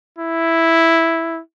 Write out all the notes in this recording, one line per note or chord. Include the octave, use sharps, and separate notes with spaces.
E4